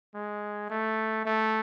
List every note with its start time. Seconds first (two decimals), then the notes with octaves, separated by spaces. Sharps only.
0.15 G#3
0.70 A3
1.25 A3